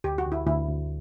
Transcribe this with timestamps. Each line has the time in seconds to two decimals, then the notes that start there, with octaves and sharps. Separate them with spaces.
0.04 D2 G4
0.18 F#4
0.25 D2
0.32 E4
0.46 D2 E4
0.68 D2